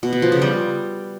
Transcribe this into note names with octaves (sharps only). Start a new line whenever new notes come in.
B2
B3
F3
C#3
G3